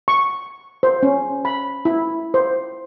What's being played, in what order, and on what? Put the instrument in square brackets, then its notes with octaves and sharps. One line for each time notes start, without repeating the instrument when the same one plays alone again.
[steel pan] C#6
C5
C#4
B5
E4
C5